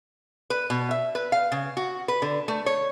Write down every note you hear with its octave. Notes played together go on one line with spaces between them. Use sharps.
B4
B2
E5
B4
F5
C#3
F#4
B4
D3
A3
C#5